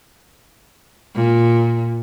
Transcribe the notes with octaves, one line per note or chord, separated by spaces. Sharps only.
A#2